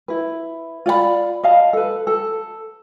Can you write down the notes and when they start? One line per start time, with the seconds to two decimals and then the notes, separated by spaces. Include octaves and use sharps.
0.08 E4 B4
0.86 F4 D5 F#5 B5
1.44 D#5 F5 A5
1.73 A4 B4
2.07 A4